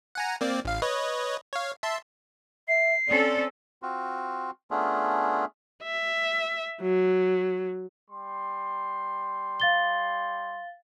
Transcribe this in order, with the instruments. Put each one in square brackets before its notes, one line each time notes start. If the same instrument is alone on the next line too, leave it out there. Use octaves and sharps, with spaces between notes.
[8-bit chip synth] F#5 G#5 A#5
A#3 C4 D5
A1 F5
B4 C#5 D#5
C#5 F5
E5 A5 C6
[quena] E5 [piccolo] C7
[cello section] C4 C#4 A4 [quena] D5
[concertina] C4 F4 F#4
A3 B3 C#4 D4 F4 G#4
[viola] E5
F#3
[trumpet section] G3 C6
[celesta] F5 A6 G7